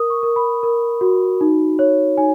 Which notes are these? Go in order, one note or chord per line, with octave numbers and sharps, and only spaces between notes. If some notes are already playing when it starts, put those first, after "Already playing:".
Already playing: A#4 D#6
C#6
A#4
B5
A#4
F#4
D#4
C#5
D#4 G#5